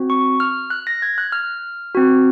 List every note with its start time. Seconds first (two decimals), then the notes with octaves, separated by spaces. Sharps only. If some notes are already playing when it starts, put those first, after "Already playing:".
Already playing: C4 F#4
0.10 C#6
0.40 F6
0.70 F#6
0.87 A#6
1.02 G#6
1.18 F#6
1.32 F6
1.95 C4 F#4